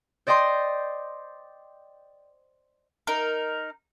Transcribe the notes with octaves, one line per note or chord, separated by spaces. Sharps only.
C5 D5 D#5 G5 C6
D#4 A#4